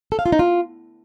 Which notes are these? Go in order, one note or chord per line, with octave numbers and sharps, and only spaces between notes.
A4
F5
F4
D#4
F4